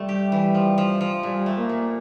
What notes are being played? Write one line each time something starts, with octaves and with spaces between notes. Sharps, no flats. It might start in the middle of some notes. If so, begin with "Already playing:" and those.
Already playing: C3 G3 A3
G4
E3
F3
F3
F3
A#2 G3
A3
A#3
A#2